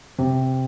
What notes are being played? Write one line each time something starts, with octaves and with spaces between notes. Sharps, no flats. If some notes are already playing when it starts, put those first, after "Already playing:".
C3